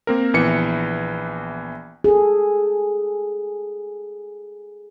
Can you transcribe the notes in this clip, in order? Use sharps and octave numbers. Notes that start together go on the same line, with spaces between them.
A#3 C4 A#4
A#1 E3 B3 C#7
G#4 A4